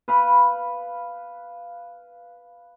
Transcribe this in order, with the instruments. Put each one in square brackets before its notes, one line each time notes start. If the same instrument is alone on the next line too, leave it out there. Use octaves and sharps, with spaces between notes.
[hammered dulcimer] B4 F5 B5